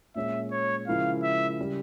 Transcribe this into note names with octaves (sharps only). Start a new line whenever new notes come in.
A#2 G#3 C#4 E5
C#5
C#3 F3 G#3 E4 A#4 F5
E5
C#3 G3